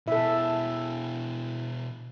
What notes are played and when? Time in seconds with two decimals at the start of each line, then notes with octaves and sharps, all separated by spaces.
0.08 B2 E4 G#4 A4 E5